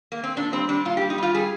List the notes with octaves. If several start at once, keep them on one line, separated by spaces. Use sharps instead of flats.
A#3
C4
A#2 D4
G3 C4
G3 D4
A#2 F4
G4
G3
D#4
G3 F4
G3 G#4